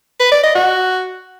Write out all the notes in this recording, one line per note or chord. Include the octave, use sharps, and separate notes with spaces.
B4
D5
D#5
F#4